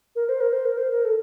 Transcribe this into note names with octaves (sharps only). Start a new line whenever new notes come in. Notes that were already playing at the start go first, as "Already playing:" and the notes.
A#4
C5
A#4
C5
A#4
C5
A#4
A4